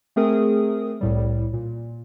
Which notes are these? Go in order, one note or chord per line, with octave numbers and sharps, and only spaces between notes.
A3 C4 G#4 A#4 D#6
C2 A2 G3
A#2